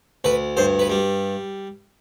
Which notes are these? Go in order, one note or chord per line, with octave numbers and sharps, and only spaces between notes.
D2 B4
G2 C5
B4
G3